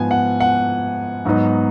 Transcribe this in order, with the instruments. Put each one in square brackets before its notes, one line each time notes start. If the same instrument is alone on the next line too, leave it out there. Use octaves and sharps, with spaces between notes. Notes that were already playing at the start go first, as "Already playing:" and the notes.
Already playing: [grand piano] G#2 F3 B3 G#5
F#5
F#5
G#2 F#3 B3 D#4